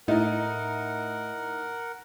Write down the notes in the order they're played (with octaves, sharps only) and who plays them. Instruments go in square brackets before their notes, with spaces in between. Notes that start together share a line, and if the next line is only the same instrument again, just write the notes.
[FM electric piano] A2 [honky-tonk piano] D#4 [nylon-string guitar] E4 D#5 [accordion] A#4 F#5